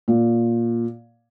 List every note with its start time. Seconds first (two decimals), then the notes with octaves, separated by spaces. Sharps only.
0.08 A#2